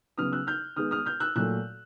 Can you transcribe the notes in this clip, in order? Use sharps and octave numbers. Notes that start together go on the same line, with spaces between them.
C#3 F#3 B3 D#6 F6
E6 F#6
F6 G6
D#3 G#3 B3 D#6 F6
D#6 F6
F6 G6
E6 F#6
A#2 F#3 A3 E6 F#6